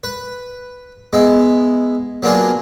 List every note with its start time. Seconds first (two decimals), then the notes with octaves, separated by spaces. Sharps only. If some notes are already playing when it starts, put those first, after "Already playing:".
0.04 B4
1.13 G#3 B3 E4
2.23 F#3 A#3 B3 D4 F4 G#4